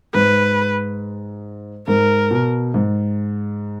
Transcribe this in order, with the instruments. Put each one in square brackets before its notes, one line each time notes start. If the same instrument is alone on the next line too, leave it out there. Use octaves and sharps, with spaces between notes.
[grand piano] G#2 [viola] B4
[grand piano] G#2 [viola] A#4
[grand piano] B2
G#2